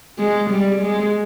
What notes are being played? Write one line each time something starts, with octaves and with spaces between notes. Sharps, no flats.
G#3
G3
G#3